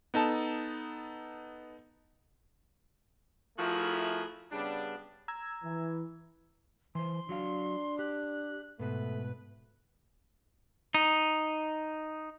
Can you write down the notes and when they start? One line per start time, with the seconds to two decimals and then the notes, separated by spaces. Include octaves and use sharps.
0.14 B3 D#4 A4 A5
3.58 F3 A3 E4 F#4 G#4 A#4
4.52 C#3 G3 B3 D4
5.28 A#5 E6 G#6
5.63 E3
6.95 E3 C5 C6
7.29 F#3 D4 F#4 F5
7.99 G4 F#6
8.79 G#2 B2 A3 B4
10.95 D#4